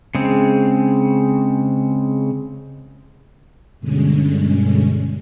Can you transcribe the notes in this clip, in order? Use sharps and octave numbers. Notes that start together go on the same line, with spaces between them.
C#3 G#3 C4
G2 B2 D3 G#3 C#4